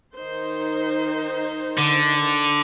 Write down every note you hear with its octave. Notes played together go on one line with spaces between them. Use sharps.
D#3 D#4 C5
D3